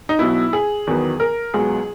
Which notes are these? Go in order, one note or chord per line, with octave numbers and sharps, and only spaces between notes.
D#4
B1 B2 F#3 B3 E4
G#4
E2 D#3 F#3 B3
A#4
C#2 B2 F#3 G#4